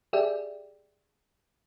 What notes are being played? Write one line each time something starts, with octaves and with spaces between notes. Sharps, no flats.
G4 G#4 D5 E5 G5